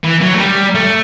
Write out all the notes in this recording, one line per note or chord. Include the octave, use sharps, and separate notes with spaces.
E3
F#3
A3
G3
A3